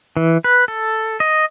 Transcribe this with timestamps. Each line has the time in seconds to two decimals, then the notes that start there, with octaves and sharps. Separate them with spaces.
0.17 E3
0.44 B4
0.68 A4
1.20 D#5